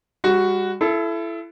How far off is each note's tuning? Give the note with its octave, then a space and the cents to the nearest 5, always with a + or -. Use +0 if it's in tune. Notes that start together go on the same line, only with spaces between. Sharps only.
G3 +35 F#4 +0
E4 +25 A4 -20